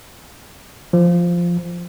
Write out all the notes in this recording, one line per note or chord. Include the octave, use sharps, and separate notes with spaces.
F3